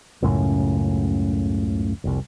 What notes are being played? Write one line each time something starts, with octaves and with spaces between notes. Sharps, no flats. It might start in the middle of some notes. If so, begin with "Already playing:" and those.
C#2 F#2 A2 C#3
F1 C2